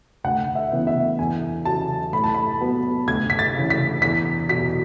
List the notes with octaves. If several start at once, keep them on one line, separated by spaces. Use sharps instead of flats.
D2 F#5
E5
C#3 E3 B3
E5
E2 G#5
C#3 F#3 A5
A2 B5
A5
B5
F#3 B3
D2 G#6
B6
A6
C#3 E3
B6
E2 B6
B2 F#3 B6